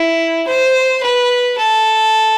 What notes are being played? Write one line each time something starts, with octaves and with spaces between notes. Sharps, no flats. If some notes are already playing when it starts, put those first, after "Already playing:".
Already playing: E4
C5
B4
A4